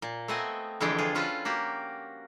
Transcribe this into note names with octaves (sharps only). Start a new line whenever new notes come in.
A#2
A3 B3 C4 D#5 F#5 G#5
F2 D3 E3 G#3 G#4 G5
F4 G#4
C#4 F4 F#4 A4 B4
A#3 F#4 G4